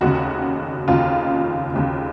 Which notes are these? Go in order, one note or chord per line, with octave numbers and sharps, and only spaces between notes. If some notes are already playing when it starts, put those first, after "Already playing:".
F1 D#2 C#3 F#4
F1 D#2 C#3 F4
F1 D#2 C#3